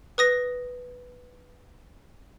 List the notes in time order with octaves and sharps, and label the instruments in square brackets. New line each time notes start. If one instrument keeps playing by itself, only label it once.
[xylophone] B4 D#6 A#6